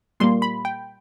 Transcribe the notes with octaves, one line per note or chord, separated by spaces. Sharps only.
A#2 G3 A#3 C6
B5
G5